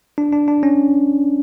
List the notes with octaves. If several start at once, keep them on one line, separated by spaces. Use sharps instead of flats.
D4
D4
D4
C#4